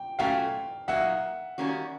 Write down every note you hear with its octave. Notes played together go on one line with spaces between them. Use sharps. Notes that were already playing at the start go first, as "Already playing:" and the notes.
Already playing: G5
A#2 F#3 A3 C#4 F#4 F5 G5
A#2 F#3 A#3 D#4 E5 F#5
D#3 G3 A#3 C#4 F#4